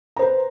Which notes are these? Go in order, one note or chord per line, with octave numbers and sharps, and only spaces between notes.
B4 C5 A#5